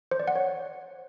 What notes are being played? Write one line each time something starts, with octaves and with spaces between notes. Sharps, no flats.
C5
D5
F#5
C#5